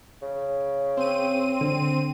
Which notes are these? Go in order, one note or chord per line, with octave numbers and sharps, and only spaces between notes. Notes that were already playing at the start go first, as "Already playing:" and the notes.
C#3
C4 D#7
D3